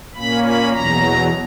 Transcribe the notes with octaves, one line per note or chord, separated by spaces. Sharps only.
A#2 A#3 C#4 B5
B5
E2 B2 F#3 A#5